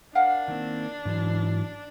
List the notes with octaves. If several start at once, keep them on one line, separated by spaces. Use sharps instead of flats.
D4 A#4 F5 F#5
D#3 A#3 C4
G#2 E3 F#3